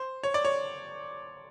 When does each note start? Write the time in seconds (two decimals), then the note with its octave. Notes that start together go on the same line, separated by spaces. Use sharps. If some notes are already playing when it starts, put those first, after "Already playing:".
Already playing: C5
0.23 C#5
0.34 D5
0.45 C#5